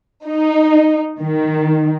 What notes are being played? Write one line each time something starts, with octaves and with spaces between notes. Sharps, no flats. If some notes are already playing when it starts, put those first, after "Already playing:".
D#4
D#3